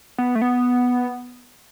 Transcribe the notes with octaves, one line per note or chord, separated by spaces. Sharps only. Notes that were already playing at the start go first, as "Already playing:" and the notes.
B3
A3
B3